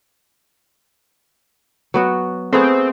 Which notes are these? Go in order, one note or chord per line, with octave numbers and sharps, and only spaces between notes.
F#3 B3 F#4
A3 B3 C4 G#4